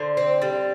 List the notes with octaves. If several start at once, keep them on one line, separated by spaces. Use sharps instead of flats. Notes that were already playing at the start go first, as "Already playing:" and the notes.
Already playing: D3 C5
C4
G3